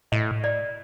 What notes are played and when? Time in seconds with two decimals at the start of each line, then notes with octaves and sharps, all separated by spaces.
0.12 A2 D#5
0.44 D5